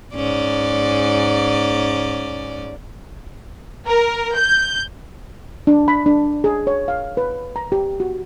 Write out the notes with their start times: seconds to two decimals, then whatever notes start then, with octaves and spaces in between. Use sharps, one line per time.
0.15 G#2 C#4 D5
3.88 A#4
4.37 G6
5.67 D4
5.88 B5
6.06 D4
6.44 G#4
6.67 C#5
6.88 F5
7.17 B4
7.56 A#5
7.72 G4
8.00 F#4